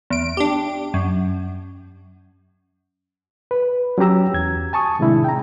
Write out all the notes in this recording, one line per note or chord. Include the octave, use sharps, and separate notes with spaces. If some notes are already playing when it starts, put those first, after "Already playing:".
E2 D7
D4 G4
F#2
B4
F#3 C#4 F#4 G4 A#5 E6
E2 G#6
G#5 A5 C#6 D#6
A2 C3 D#3 G#3 D4 E4
G5 A#5